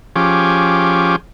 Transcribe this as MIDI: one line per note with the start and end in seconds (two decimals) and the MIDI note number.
0.16 1.16 53
0.16 1.16 61
0.16 1.16 67
0.16 1.16 68
0.16 1.16 86